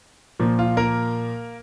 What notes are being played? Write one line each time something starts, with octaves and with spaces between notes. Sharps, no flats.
A#2 F3 A#3
F4
A#3 A#4